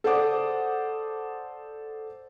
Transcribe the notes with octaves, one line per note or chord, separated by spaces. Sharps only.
A4 C5 D5 F#5 D6 D#6